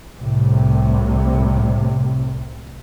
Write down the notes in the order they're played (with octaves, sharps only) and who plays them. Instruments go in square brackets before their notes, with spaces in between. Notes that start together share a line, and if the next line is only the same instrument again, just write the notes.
[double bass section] C2 A2 C3